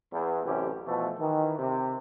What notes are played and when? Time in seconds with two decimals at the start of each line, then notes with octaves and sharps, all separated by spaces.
0.13 E2
0.45 A1 F#2 C3 E3 C#4 G4
0.86 B2 E3 F3 A3
1.19 D#3 E3
1.58 C3